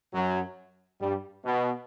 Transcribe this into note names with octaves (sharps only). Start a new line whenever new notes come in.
F#2 F#3
G2 G3
B2